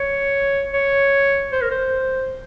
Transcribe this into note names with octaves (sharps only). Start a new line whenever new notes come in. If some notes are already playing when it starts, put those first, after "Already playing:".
Already playing: C#5
C#5
C5
A#4
C5